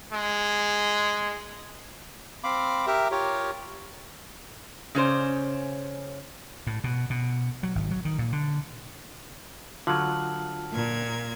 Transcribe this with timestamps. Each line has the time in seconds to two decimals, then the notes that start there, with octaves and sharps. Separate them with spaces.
0.13 G#3
2.44 C4 F5 B5 D6
2.87 G4 A#4 E5
3.11 F4 G4 A#4 C#5
4.95 C#3 C#4 C5 D5
6.67 A2
6.84 B2
7.10 B2
7.63 F#3
7.75 G#1
7.91 F#3
8.05 D#3
8.19 A#2
8.32 D3
9.87 D3 F#3 F4 A5 F6 F#7
10.71 A#2 G#6